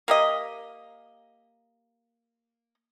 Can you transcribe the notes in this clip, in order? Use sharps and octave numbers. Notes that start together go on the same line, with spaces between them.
A#3 G4 D#5